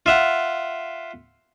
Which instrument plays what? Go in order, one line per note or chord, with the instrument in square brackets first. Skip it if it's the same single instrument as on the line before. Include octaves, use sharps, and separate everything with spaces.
[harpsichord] F4 E5 F#5